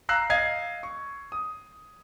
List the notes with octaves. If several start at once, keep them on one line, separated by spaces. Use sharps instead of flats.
F5 A#5 E6 F#6 C7
D#5 F5 G#6 C7
C#6
D#6